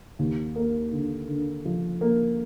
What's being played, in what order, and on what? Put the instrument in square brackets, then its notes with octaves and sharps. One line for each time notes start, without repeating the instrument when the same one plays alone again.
[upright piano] D#2
A#3
D3
D3
F3
A#3